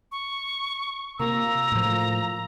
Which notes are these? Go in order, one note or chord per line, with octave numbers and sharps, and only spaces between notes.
C#6
C3 A#3 F4 A#5 E6
A2 F3